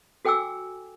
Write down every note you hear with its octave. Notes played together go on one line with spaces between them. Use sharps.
F#4 A4 G5 G#5 D6 E6